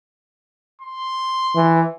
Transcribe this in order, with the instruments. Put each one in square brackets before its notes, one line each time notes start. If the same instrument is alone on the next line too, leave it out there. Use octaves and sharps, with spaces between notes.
[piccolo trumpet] C6
[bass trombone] E3